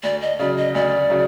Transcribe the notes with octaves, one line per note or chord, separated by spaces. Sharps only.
D2 D5
D#5
C#3 F#3 D5
D#5
D2 D5
C#3 F#3